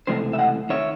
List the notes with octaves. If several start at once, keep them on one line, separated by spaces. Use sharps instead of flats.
C#2 C3 E3 A3 C5 D#5
E5
D#5 F#5
C3 D#3 C#5 E5